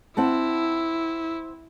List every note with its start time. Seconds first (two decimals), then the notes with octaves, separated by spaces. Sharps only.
0.17 C4 E4 F#5 A5